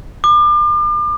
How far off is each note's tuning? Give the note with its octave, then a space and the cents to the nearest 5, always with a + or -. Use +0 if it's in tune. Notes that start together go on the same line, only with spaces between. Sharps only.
D6 +40